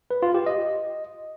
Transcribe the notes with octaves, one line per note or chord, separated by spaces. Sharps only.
B4
F4
G4
D#5